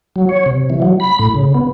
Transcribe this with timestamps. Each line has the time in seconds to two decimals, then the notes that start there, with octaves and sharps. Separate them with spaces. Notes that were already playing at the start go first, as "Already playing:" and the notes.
0.16 F#3
0.29 C#5
0.46 C3
0.70 E3
0.82 F#3
1.00 B5
1.19 A2
1.35 C#3
1.54 B3